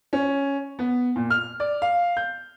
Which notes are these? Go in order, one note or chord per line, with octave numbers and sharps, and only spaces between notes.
C#4
B3
A#2
F6
D5
F5
G6